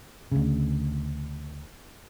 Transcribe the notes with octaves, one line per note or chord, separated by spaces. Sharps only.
D2 C#3